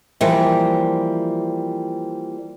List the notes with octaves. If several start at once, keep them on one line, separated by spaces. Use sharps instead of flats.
E3 F3 G3 A#3